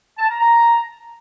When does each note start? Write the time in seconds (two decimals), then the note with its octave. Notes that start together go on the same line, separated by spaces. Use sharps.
0.18 A5
0.29 A#5
0.39 A#5